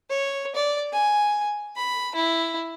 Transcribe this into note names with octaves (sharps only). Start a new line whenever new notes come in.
C#5
D5
G#5
B5
E4